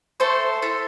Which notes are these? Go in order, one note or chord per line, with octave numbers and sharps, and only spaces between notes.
A3 A4 C5
E4 A4